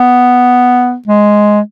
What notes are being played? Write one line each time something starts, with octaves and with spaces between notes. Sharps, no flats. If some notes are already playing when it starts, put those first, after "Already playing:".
Already playing: B3
G#3